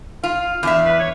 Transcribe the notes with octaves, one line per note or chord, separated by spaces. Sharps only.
F4 F5
E2 D4 E5
B4
C#5